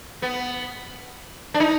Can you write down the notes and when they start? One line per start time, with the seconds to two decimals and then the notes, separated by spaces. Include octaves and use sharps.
0.22 B3
1.54 D4
1.60 D#4